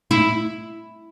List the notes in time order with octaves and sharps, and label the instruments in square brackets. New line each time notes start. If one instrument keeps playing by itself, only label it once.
[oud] E4